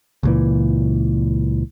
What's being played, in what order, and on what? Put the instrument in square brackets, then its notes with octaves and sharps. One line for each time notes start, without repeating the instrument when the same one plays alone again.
[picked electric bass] C#2 A#2 E3